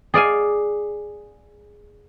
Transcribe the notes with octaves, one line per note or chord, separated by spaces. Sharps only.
G#4 D5 F5 G#5